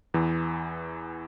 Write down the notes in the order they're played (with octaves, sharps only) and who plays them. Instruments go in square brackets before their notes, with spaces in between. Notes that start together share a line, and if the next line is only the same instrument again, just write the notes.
[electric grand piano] E2 E3